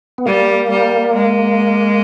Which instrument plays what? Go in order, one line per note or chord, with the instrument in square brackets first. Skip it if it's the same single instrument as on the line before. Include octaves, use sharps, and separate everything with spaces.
[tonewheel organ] B3
[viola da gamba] G3 [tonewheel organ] A#3
[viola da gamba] G3
G#3